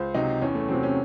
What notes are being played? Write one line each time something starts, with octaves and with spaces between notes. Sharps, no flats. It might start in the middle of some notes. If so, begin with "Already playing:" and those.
Already playing: C#2 C5
C3 F#3 D#4
E2 C#4
A3
C3 F#3 C4
C#4